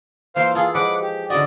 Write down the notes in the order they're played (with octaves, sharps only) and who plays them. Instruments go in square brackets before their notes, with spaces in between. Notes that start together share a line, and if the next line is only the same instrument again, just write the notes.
[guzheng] E3 A#3 F4 [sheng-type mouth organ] C5 F5
[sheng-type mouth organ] F4 [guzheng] G#4 A4
[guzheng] F3 G#3 D#5 [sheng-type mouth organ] F#5 B5 D6
[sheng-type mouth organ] G4
[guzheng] D3 E4 F#4 [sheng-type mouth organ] D5 D#5